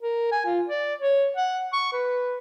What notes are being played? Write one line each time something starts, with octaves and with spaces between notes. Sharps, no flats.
A#4
G#5
F4
D5
C#5
F#5
C#6
B4